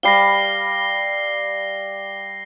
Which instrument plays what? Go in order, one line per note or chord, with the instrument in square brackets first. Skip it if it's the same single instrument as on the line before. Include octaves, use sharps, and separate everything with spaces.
[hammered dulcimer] G3 F5 [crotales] A#6 C7 G7